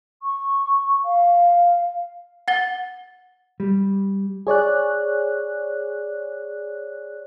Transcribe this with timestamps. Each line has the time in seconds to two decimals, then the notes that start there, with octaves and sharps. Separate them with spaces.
0.23 C#6
1.05 F5
2.48 F#5 A6 G7
3.60 G3
4.47 G#4 C#5 D5 F#6